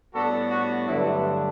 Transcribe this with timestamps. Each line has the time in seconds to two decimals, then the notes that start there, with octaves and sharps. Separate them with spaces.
0.14 A2 G3 B3 D4 F#4 A4
0.51 F#4
0.87 G2 D3 F#3 A3 D4 E4